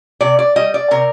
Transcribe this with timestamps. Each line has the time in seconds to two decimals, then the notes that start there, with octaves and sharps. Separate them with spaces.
0.21 C3 D5
0.39 D5
0.56 G3 D#5
0.74 D5
0.91 C3 A#4